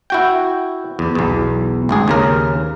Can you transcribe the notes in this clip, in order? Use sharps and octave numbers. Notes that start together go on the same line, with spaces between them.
E4 F#4 G5
E2
B1 E2
G#1 D2 G#4
D#2 C#3 A#4